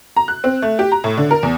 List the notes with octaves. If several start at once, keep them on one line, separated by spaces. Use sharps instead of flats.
A#5
F#6
C4
A3
G4
A#5
A2
D3
A#4
E2